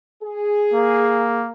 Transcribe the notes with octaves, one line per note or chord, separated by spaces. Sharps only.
G#4
A#3